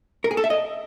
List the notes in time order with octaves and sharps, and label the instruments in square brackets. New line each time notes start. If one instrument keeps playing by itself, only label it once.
[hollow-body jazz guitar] A#4
G#4
A4
E5
D#5